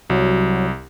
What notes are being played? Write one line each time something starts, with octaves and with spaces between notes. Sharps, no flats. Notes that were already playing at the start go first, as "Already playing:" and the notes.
C2 F#3